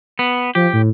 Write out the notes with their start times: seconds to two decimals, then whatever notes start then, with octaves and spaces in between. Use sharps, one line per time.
0.19 B3
0.55 F3 G4
0.73 A2